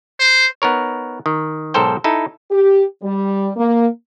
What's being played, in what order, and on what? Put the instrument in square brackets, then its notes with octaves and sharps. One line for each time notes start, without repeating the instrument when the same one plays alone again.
[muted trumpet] C5
[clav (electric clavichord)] B3 D#4 A#4 C#5
D#3
B1 G#2 A4 A#4 C5 G5
D#4 E4 A4
[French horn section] G4
G3
A#3